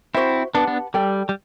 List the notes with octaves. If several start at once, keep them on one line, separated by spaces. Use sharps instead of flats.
C4 E4 F#4 C5 E5
B3 D4 G4 B4 F#5 A5
B3 D4
G3 A4 D5 G5
G3